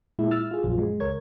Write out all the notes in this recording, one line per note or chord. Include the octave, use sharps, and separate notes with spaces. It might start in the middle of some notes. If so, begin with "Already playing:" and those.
A#2 G#3 E4
E4 E6 F6 A6
F4 G#4
A#1 F#2 F3 F#3 F4
G#3
C#2 A#4 C#5 G#6